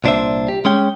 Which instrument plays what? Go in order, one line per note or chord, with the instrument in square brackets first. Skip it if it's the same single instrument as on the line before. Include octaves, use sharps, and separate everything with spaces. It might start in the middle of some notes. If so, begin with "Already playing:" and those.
[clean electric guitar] C2 A#2 D4 D#4 C5 E5
G4
G#3 C#4 G5